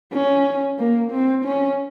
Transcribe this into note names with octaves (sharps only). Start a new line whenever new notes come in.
C#4
A#3
C4
C#4